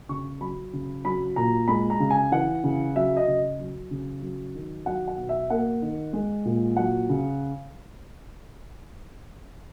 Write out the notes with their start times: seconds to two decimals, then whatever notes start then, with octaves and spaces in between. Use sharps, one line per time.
0.09 C#3 C#6
0.41 F#3 B5
0.73 C#3
1.05 F#3 B5
1.36 A#2 A#5
1.68 G#3 B5
1.90 A#5
2.00 C#3
2.10 G#5
2.32 E3 F#5
2.64 C#3
2.95 F#3 E5
3.17 D#5
3.27 C#3
3.59 F#3
3.91 C#3
4.22 F#3
4.55 D#3
4.86 F#3 F#5
5.08 F#5
5.18 B2
5.29 E5
5.50 A#3 F#5
5.82 D#3
6.13 G#3
6.45 A#2
6.77 F#3 F#5
7.09 C#3